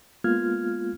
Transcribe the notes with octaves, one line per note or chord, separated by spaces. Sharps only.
G#3 A#3 B3 F4 F6 G#6